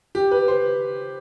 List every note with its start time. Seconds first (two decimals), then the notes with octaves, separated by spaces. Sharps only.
0.15 G4
0.31 B4
0.48 C5